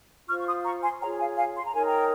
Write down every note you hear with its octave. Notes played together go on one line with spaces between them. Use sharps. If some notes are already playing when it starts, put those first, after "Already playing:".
F4 C5 C#6 F6
C#6
C6 D#6
A#5 C#6
G#5 C6
F4 G#4 C#5 G5 A#5
F5 G#5
F5 G#5
C6
A#5
D#4 A#4 C#5 G#5
G5 A#5